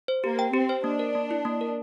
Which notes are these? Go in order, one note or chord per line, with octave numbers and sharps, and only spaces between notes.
C5
A#3 G4
G5
C4 G4
C5
A#3 D4
A#4
A#3
E4
A#3
A#4